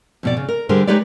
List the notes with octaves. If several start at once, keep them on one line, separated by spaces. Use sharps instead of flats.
F2 B2 D5
C#3
A#4
D3 G3 G4 G#4 A#4 C5
G#3 D#4 G4 B4 C#5 D5